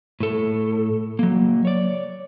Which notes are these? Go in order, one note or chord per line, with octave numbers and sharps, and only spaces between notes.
A2 A4
F#3 A#3
C#5 D5